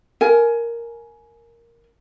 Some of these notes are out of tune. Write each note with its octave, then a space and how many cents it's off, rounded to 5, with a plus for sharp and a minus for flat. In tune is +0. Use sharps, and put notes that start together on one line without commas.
A#4 +0 G#5 +20